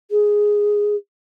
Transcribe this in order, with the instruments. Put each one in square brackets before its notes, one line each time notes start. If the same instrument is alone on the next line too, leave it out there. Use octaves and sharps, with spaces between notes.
[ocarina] G#4